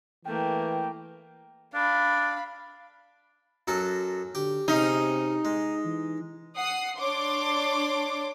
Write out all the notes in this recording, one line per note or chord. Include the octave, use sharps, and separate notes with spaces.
E3 A3 A#3 G5
D4 F5 B5
F#2 F#3 A4
D3 G4
C3 C#4 D#4 G#4 F5
G#3
E3
F#5 D#6 C7
D4 C#5 C6 D6